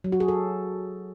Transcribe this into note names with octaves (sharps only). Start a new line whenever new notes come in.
F#3
F#4
G#4
A4